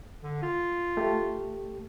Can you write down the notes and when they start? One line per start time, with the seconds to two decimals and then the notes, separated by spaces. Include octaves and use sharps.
0.23 D3
0.43 F4
0.97 A3 G4 A4